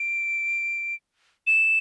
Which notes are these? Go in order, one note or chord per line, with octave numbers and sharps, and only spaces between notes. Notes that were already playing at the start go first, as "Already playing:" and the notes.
Already playing: D7
E7